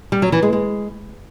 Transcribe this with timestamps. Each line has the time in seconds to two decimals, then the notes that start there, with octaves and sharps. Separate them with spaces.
0.12 G3
0.22 F#3
0.32 E3
0.42 G#3
0.53 G#3